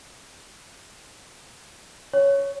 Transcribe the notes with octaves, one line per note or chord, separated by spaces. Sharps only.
C#5